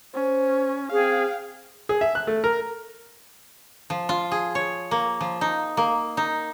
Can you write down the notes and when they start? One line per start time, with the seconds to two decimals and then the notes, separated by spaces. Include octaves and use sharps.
0.14 C#4 C5
0.92 C4 G#4 F5 G5
1.89 G#4
2.01 E5
2.15 F#6
2.27 A3
2.44 A#4
3.90 F3
4.09 F4
4.31 G#4
4.55 C#5
4.91 A#3
5.21 F3
5.41 D#4
5.77 A#3
6.17 D#4